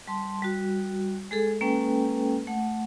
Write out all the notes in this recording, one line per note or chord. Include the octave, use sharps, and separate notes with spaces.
G3 A5 C6
G3 F#4
G#3 G#4 A4
G#3 A#3 C#4 A4 B4 G5
A3 F#5